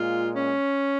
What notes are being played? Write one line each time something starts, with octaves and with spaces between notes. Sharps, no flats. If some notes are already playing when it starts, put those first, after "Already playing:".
Already playing: A#2 G#3 F4
C#4